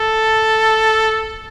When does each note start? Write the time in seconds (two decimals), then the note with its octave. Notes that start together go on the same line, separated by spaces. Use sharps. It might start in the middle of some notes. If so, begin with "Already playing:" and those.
Already playing: A4